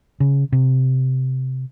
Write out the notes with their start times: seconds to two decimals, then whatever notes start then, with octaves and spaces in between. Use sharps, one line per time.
0.20 C#3
0.52 C3